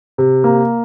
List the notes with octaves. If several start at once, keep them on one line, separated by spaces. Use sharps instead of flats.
C3
A#3